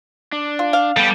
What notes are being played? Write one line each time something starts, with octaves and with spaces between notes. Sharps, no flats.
D4
F4
F5
G3 B3 G4 A4